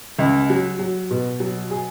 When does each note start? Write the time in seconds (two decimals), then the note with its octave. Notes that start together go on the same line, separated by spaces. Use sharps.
0.19 C#2
0.50 F#3
0.79 F#3
1.10 B2
1.40 F#3
1.70 G#4